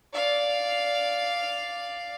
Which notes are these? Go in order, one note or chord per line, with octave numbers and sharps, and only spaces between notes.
D5 F5